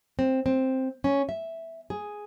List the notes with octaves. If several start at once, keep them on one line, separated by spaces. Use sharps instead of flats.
C4
C4
C#4
E5
G#4